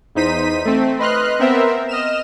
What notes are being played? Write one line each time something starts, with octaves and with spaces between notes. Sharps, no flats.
E2 D#4 C5 B6 D#7
A3 C4
B4 D#5 C6 F6 F#6
B3 C4 A#4 C5 E5
D#5 F6 E7